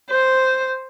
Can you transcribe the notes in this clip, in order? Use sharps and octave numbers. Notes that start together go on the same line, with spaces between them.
C5